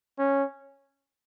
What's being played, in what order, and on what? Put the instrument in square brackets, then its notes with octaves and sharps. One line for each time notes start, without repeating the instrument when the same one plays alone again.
[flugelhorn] C#4